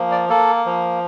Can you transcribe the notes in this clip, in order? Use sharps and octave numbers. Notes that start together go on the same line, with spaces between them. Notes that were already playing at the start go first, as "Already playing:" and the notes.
Already playing: F3 A#3
D5
A#3 A4
F3